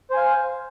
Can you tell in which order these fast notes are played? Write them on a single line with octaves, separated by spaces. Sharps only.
C5 G#5 F5